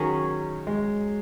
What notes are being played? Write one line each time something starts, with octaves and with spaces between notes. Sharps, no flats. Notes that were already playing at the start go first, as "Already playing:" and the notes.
Already playing: D#3 F#3 C#4 G#4
G#3